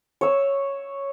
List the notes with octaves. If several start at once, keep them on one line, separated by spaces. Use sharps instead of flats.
C#5 E6